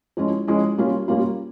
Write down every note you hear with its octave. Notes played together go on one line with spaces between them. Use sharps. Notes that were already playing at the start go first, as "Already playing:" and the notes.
F3 G#3 C#4 E4
F3 G#3 C#4 E4
G3 A#3 C#4 F4
G3 A#3 C#4 F4